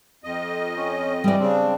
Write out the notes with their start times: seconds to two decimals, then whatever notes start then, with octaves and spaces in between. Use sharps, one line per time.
0.24 F2 D#5
0.77 C#4
1.24 E3 G3 D5
1.39 C#3 C4 D4